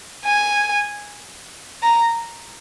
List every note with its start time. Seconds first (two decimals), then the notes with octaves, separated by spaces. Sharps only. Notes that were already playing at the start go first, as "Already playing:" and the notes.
0.25 G#5
1.83 A#5